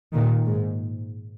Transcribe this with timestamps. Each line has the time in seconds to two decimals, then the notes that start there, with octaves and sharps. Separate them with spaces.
0.14 A#2 D#3
0.46 G#2